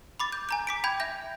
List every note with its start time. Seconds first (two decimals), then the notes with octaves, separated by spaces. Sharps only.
0.20 B5 D6 A6
0.33 G6
0.49 G#5 A#5 G6
0.67 D6 B6 D7
0.84 G5 B5 G6 G#6
1.00 E5 G6 A#6